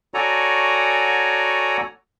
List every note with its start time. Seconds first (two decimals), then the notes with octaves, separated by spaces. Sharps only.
0.14 F#4 A4 C#5 D5 G#5 A#5